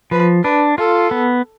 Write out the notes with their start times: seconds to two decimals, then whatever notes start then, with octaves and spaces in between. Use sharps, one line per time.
0.11 F3 B4
0.44 D4 B4
0.78 F4 A4
1.11 B3